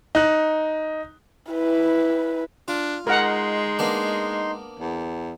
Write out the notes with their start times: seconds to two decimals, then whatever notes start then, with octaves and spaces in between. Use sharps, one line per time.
0.15 D#4 F#6
1.52 E4 B4
2.68 D4 F4
3.07 G#3 D#4 A#4 F#5 C6
3.79 A#3 B3 D4
4.80 E2